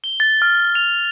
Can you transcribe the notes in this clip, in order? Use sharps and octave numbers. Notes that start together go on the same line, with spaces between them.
G7
A6
F6
F7